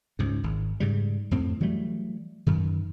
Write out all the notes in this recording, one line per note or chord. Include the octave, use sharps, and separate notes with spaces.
C#2 G#2
G#1
G#2 C#3 G3
F2 A2 C4
E3 F#3 G3 A3
F#2 D#3